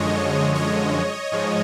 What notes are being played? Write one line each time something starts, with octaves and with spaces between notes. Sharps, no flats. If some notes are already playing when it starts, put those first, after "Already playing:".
Already playing: F#2 D3 F3 G#3 C#5 D#5
C#5 D#5
G#2 F3 G#3